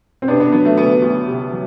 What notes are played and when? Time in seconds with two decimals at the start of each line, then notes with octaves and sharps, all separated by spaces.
0.22 C4
0.28 C3 B3 D4
0.40 B3 D4
0.52 F#3 B3
0.65 A3
0.77 D2 B3
1.02 D2
1.27 C3
1.52 F#3